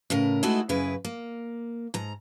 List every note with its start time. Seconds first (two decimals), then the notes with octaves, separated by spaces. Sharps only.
0.10 A2 C#3 A#4
0.43 G#3 A3 D#4 E4 F#4
0.69 F#2 C#3 E4 G#4 B4
1.05 A#3
1.94 G#2 A#5